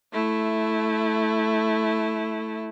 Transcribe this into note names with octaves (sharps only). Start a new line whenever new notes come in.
A3 E4